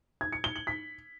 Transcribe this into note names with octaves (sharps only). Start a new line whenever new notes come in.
G#6
C#7
G7
F#7
B6